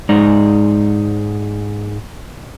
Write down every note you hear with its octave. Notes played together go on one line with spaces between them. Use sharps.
G#2 G#3 D#4 D5 A#5